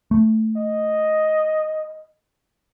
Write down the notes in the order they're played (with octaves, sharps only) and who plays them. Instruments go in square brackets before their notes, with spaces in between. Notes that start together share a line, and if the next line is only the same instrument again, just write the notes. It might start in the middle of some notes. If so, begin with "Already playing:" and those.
[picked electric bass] A3
[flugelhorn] D#5